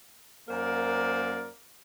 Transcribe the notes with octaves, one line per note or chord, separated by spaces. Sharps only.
F#2 A#3 A#4 C5 D5